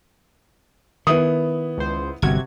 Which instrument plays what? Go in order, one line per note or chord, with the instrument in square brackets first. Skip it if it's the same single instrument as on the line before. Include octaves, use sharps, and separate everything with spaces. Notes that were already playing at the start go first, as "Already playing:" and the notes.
[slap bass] D#3 [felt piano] B3 E4 D#6
[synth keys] C#2 C5
[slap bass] G1 [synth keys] C3 F#4 G#6